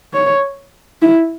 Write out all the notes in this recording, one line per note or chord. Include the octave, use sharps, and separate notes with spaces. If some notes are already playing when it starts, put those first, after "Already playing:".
C#5
E4